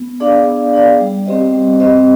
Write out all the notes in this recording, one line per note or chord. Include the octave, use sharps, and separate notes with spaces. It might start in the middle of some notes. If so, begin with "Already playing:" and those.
Already playing: B3
D4 G#4 D5 F5
B3
D4 G#4 D5 F5
G3
C4 G4 C5 D#5
G3
C4 G4 C5 D#5